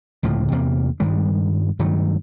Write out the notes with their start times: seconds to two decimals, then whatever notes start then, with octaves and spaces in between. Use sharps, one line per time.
0.23 C#2 A2 D3 F3
0.52 E2 C3 A#3
1.00 G2 D#3 G3 G#3
1.79 G2 D#3 F#3 A3